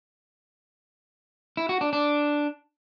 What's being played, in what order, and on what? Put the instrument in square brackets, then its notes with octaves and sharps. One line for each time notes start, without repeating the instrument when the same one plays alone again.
[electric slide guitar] E4
F#4
D4
D4